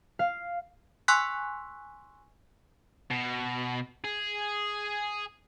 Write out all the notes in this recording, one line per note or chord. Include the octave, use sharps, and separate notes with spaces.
F5
G#5 C6 C#6 E6 F#6 B6
B2
G#4